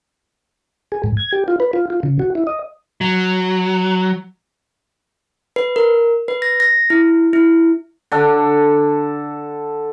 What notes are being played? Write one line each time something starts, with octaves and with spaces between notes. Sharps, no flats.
G#4
G#2
G#6
G4
F4
B4
F4
F4
C#3
F#4
E4
D#5
F#3
B4
A#4
B4
A#6
A#6
E4
E4
D3 A4